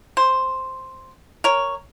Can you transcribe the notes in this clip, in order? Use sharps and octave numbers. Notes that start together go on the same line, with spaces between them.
C5
A#4 C#5